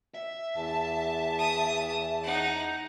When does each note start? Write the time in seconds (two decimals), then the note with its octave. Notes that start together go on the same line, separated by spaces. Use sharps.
0.14 E5
0.56 E2 A5
1.39 D#6
2.23 D#4 F#5